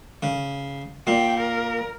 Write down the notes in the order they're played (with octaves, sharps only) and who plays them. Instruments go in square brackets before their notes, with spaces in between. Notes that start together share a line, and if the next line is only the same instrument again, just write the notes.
[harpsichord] C#3
[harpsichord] A#2 [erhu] G5
[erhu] A#4